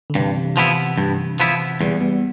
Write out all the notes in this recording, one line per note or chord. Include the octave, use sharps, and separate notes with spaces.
D3
G2 C3 E3
F3 B3 E4
G2
F3 B3 E4
E2 G3 B3
G3 B3